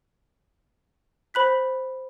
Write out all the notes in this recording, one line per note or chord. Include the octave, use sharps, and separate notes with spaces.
C5 B5 F#6 B6